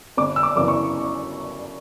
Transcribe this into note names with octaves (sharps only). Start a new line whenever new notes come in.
G1 D6
E6
D6
F#2 C#3 E3 B3 D6
C#6